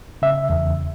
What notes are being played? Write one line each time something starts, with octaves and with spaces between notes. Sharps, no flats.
C#3 E5
E2